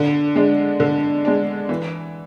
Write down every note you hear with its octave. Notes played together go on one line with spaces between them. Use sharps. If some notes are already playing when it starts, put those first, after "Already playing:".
Already playing: D3
G#3 D4
D3
G#3 D4
E3